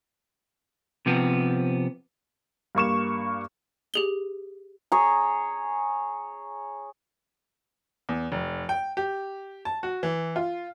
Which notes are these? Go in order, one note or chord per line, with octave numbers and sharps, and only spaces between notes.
C3 F3 B3
G2 A#3 C#6 E7
G4 G#4 G7
G#4 C#5 A#5
E2
F1
G5
G4
A5
F#4
E3
F4